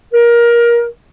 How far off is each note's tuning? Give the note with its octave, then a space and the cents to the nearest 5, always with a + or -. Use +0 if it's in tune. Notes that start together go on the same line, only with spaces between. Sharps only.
A#4 +20